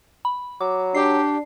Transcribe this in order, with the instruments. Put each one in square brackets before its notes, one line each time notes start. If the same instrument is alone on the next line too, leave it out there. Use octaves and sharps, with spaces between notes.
[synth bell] B5
[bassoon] F#3 [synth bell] D6
[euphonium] D4 [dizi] G4 [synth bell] C7